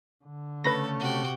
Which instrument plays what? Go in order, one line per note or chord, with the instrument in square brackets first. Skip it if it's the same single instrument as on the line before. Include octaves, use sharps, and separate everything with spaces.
[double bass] D3
[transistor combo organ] C#3 A3 [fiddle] A4 [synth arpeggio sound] B4 B5 A#6
[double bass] C3 [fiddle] F#4 G5